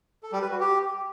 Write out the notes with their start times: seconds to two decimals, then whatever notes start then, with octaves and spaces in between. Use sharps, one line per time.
0.23 A4
0.32 G3
0.42 B4
0.51 F#4
0.60 G4